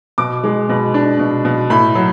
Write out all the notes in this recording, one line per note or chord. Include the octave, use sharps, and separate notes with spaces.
B2 D6
G#3
B2
D4
B2
B2
A2 B5
F#3